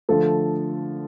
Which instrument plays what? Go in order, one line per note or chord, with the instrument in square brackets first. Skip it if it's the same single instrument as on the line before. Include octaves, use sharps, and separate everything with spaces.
[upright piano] D3 F3 A3 A4